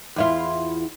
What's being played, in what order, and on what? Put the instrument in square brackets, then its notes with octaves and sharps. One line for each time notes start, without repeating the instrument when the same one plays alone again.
[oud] E2 E4 F4